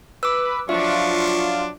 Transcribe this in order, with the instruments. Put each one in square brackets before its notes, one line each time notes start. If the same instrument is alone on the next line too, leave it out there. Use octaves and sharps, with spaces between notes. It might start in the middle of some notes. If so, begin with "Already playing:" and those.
[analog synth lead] B4 [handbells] D6 E6
[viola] F3 C#6 [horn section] F#3 D4 [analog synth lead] F4 [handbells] E5